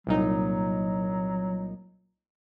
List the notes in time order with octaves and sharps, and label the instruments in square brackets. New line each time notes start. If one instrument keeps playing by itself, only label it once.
[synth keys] C2 A#2 D#4 [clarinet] F#3